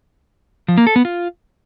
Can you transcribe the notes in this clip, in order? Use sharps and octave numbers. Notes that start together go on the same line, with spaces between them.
F3
A#3
A4
B3
F4